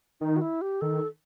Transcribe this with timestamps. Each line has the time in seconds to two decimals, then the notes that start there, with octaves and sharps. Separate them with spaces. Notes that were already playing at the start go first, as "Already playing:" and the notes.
0.21 D#3 D#4
0.36 F#4
0.41 E4
0.61 G4
0.81 D#3 A4